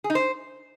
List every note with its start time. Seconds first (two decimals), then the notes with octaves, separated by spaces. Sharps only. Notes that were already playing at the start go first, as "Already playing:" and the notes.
0.04 G#4
0.10 D#4
0.15 C5